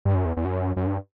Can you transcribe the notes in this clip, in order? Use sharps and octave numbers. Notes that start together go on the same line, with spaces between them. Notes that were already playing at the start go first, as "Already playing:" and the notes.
G2
F#2
E2
E2
F#2
F#2
G2